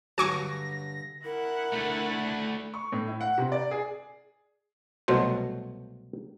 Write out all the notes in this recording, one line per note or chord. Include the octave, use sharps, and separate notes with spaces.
G2 D3 F#3 G#5 C#6 D6 A#6
E4 A#4 F#5
A3 D4
C#6
A2
E4
F#5
C3
D5
G#4
C2 B2 F#3 A3 C5